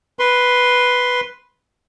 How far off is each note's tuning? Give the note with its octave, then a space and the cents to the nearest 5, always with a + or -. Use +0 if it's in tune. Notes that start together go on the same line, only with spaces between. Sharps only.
B4 +0 C6 +0